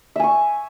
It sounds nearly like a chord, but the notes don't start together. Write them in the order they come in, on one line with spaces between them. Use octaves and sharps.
E5 G#5 C#6